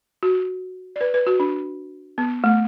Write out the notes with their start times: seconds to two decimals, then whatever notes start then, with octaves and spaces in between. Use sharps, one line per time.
0.23 F#4
0.96 D5
1.01 B4
1.14 B4
1.27 F#4
1.40 D4
2.18 B3
2.44 A3